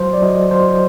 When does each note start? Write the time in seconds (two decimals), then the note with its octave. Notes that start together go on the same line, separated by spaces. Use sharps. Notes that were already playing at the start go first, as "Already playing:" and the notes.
Already playing: F#3 C5
0.13 D5
0.22 F#3 D#5
0.51 F#3 C5